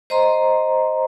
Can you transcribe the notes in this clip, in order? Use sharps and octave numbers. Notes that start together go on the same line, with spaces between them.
C5 D#5 A#5 C6